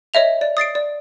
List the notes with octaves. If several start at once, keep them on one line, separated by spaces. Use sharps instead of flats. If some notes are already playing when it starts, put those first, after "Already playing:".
C#5 D#5 E5 F7
D5
D#6 A6 C7 D7
D5